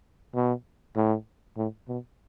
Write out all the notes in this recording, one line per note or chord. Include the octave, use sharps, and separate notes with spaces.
B2
A2
A2
B2